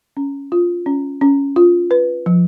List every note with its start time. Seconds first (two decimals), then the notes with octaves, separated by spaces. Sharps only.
0.17 C#4
0.52 F4
0.86 C#4
1.21 C#4
1.56 F4
1.91 B4
2.26 F3